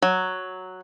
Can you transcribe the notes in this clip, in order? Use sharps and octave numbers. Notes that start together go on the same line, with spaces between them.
F#3